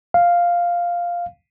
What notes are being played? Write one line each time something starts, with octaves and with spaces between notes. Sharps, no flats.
F5